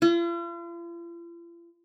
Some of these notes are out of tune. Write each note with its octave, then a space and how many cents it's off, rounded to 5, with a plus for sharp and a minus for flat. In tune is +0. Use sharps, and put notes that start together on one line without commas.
F4 -45